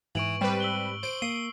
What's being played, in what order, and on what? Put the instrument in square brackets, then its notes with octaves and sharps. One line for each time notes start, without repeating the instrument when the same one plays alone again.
[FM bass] G#2 [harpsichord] E3 [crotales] C#6 D7 F#7
[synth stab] G3 B4 [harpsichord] C4
[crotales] E6 F#7 G7
[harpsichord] C5 [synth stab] D7
[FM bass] A#3 [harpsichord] D#6 [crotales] C7